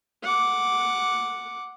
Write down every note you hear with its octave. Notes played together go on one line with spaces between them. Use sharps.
F#5 D6